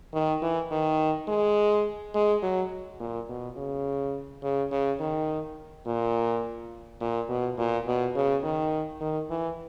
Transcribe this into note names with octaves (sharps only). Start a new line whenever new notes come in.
D#3
E3
D#3
G#3
G#3
F#3
A#2
B2
C#3
C#3
C#3
D#3
A#2
A#2
B2
A#2
B2
C#3
D#3
D#3
E3